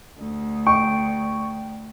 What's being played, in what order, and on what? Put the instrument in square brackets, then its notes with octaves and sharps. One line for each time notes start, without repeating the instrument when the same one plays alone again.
[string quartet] D2
[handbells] G5 [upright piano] C#6